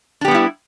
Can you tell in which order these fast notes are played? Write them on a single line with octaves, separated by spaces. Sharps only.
D4 G4 B3 G3 E4